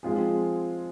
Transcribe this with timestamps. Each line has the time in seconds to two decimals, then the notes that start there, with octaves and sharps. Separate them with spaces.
0.03 F3 G#3 C4 F4 G#4